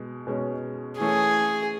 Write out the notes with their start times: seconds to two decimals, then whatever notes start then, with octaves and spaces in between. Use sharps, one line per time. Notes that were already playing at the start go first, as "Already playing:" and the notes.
Already playing: B2 G#3
0.27 B2 G#3 C#4
0.99 E3 A3 C#4 G#4